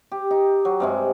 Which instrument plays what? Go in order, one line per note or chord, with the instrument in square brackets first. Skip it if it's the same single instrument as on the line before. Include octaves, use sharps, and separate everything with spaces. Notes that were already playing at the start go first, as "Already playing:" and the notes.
[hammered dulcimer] G4
D#4
F#3
G2 C3 G#3